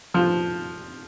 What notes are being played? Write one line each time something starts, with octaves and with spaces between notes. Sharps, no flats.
F3